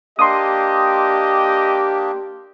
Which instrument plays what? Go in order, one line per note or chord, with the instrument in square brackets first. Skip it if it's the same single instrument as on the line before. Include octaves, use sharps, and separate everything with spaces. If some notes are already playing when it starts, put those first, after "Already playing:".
[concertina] A#3 D4 [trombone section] G4 [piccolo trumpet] D#5 [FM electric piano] C6 D#6